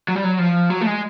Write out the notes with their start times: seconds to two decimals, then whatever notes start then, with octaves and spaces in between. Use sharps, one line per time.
0.08 F#3
0.15 G3
0.24 F#3
0.39 F3
0.70 F#3
0.81 A3
0.86 G#3